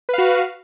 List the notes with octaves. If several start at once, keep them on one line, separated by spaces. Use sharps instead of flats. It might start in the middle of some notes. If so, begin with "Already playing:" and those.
F#4 B4 F5